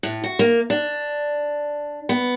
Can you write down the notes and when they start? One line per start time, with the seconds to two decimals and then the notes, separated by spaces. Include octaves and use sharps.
0.03 A2
0.24 F#4
0.39 A#3
0.70 D4
2.09 B3